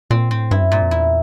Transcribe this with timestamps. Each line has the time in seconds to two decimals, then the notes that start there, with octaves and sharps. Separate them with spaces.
0.11 A#2 C4
0.31 A2 C4
0.51 G2 E4
0.61 F#2
0.71 G2 A#2
0.82 F2
0.91 E2 E4